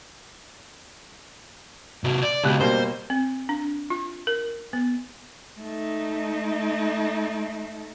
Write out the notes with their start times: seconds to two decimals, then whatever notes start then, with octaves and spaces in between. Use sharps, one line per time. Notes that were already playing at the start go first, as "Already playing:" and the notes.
2.04 C3 F#4
2.23 D5
2.44 C#2 B2 G4 F#6
2.60 B2 G3 A#3 C5
3.10 C4
3.49 D4
3.90 F4
4.27 A#4
4.73 B3
5.60 A3 D#4